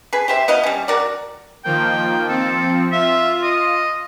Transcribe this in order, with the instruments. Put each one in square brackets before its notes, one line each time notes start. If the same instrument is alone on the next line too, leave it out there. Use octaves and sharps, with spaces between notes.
[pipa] G#4 B4
G4 C5 E5
B3 E4 D#5 F5
G3 C#4
F#4 A#4 D5
[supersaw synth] D#3 F3 A#3 [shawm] G5
[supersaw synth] F3 C4 [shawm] A4
[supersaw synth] F4 [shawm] E5
[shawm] D#5